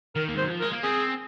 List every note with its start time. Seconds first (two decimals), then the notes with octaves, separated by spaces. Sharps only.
0.16 D#3 A#4
0.28 A#3
0.35 G#3
0.37 C5
0.42 F#3
0.50 F3
0.60 G#3 A#4
0.72 A#3
0.83 C4 G#4